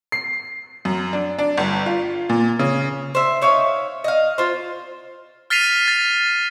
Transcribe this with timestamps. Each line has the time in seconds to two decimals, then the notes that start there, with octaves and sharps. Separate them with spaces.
0.12 C7
0.85 F#2
1.13 D4
1.39 D4
1.57 G1
1.86 F4
2.29 A#2
2.59 C#3
3.15 C5 E5
3.42 D#4 C#5 E5 F5
4.04 D#5 F5
4.38 F4 C5
5.50 F6 A6 B6 C7 D#7 F7
5.88 A6